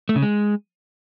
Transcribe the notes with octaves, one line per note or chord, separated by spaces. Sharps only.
A3
C#3
G#3